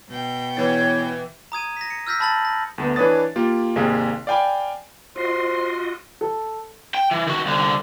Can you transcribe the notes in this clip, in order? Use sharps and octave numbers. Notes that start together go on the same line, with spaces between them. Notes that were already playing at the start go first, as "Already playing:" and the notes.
B2 G5
E2 E3 C#5 A6
A#5 D#6 G#6 D#7
A#6 B6
C#7
E6 F6 G6 A#6 B6
A5 B5 E6 A6 A#6 F#7
A#6
D2 A3 B3
E3 D4 B4 C#5 D#6 A6
A#3 F4 G4
G#1 C3 G#3 A#3 G#4
D5 F5 G5 G#5 B5 D6
F4 F#4 C5 D#5 C6
A4
G5
E3
D#3 F#4
C2 D3